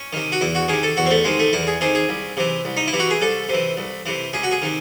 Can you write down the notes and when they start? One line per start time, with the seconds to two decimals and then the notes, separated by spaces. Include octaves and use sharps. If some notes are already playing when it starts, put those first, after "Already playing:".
Already playing: C#4
0.13 C3 D#3
0.32 F#4
0.41 E2 E4
0.55 F#4
0.68 C3 D#3 G#4
0.83 A4
0.97 E2 F#4
1.06 C4
1.11 A3
1.24 C3 D#3 G#3
1.39 A3
1.53 E2 E4
1.67 G#4
1.81 C3 D#3 G#4
1.95 G#4
2.09 C2
2.37 C3 E3
2.65 C2
2.77 D#4
2.88 E4
2.93 C3 E3
2.99 F#4
3.10 G#4
3.21 C2 A4
3.49 C3 E3
3.77 C2
4.06 C3 E3
4.33 C#2 G#4
4.43 F#4
4.51 G#4
4.62 C3 D#3